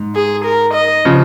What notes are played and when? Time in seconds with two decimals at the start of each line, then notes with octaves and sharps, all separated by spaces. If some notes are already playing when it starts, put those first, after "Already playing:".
Already playing: G#2
0.15 G#4
0.45 A#4
0.74 D#5
1.05 C#3 F3